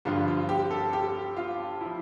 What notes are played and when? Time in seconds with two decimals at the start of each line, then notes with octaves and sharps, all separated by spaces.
0.05 G2 D3 F3 F4
0.28 F4
0.49 G4
0.70 A4
0.93 G4
1.36 F4
1.81 F3 E4